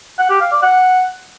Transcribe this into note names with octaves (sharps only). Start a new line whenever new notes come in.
F#5
G4
F5
D5
F#5